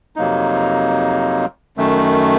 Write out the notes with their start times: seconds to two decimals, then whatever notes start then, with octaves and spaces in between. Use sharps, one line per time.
0.16 F2 C3 F#3 A#3 D#4
1.77 F#2 D#3 A3